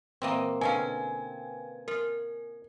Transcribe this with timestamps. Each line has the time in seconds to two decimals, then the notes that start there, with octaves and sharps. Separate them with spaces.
0.22 A#2 E3 A#3 C4 D#5
0.61 B2 D3 C#4 B4 F5 G5 G#5
1.88 F4 A#4